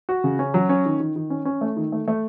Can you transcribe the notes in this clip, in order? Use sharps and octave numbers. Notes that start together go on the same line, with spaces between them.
F#4
C#3
C#4
F#3
C#4
D#3
D#3
D#3
C#4
C#4
A3
D#3
A3
A3